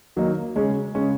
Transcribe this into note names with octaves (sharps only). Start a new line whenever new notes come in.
D#3 F#3 A#3 D#4
C#3 G#3 C#4
C#3 G#3 C#4